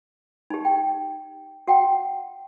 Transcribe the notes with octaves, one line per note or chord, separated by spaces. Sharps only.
D#4 G4
G5
F#4 F#5 G5